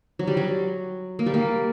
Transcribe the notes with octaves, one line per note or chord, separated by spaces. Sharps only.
F#3
G3
F#3
A#3
G3
A#3